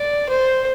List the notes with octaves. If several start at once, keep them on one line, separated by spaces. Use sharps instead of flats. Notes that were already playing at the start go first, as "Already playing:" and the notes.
Already playing: D5
C5